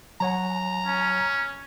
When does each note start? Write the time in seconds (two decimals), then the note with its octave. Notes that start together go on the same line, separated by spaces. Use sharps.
0.20 F#3 C#5 F#5 A#5
0.86 C#4